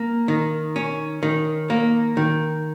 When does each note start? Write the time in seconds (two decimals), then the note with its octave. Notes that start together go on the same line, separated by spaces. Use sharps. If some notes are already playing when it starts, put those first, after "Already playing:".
Already playing: A#3
0.28 D#3
0.76 C#4
1.23 D#3
1.70 A#3
2.17 D#3